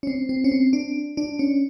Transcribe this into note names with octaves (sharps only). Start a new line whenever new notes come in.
C#4
C4
C4
C#4
C4
D4
D4
C#4